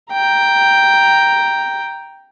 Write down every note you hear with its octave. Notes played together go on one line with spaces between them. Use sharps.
G5 A#5